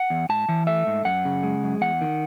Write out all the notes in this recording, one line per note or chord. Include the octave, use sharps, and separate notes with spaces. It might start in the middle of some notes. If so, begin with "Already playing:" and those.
Already playing: F#5
E2
G#2 A5
E3
A3 E5
G#2
F#2 F#5
C#3
G#3
F#2
E2 F#5
D#3